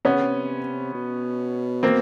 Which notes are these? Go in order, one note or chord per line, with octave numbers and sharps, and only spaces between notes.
C3 B3 C#4
C#3
C3
B2
A#3 C4